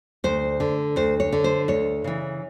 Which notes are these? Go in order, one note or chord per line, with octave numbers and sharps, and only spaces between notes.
D2 C5
D3
D2 C5
C#5
D3
C5
D2 C#5
C#3 E3